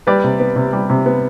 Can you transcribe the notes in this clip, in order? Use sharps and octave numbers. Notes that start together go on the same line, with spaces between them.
G3 B4 D5
C3
B3
C3
G3
C3
B3